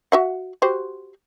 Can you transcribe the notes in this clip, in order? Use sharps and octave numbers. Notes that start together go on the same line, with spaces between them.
F#4 E5 F#5
F#4 G4 C5